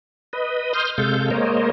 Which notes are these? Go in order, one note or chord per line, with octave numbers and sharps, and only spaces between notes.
B4 D#5
C6 D#6 F6 G6
C3 G#3 A4 F5 G6
G#3 A#3 A#4 C5 C#5 D#5